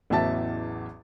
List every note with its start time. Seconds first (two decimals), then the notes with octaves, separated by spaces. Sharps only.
0.10 A1 E2 F#3 E5 A5 A6